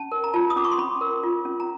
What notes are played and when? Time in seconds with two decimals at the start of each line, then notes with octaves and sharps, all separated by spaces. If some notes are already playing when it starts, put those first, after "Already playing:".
Already playing: C#4 A5
0.12 A#4
0.24 A#5
0.34 F4 A5
0.50 D#6
0.56 C#4 D6
0.64 C#6
0.71 C6
0.78 C#4 B5
1.01 A#4
1.23 F4
1.45 C#4
1.60 A#5